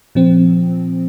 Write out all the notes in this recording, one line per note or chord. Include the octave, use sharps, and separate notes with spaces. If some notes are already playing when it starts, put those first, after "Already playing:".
A#2 F3 C4